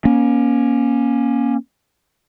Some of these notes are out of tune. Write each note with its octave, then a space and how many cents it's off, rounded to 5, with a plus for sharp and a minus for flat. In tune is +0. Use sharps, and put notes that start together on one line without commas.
A#3 +30 C#4 +0